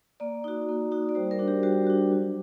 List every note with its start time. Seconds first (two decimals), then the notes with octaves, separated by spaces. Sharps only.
0.20 A#3 D5
0.44 D#4 F#4
0.69 A#3
0.92 D#4 F#4
1.09 D5
1.15 G3 C5
1.31 A#4
1.39 D4 F#4
1.48 G4
1.63 G3 F#4
1.87 D4 F#4
2.12 F#3